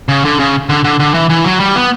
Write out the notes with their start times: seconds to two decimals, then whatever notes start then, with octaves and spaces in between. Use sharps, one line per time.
0.09 C#3
0.25 D3
0.39 C#3
0.69 D3
0.84 D3
1.00 D3
1.14 E3
1.30 E3
1.45 F#3
1.60 G3
1.75 B3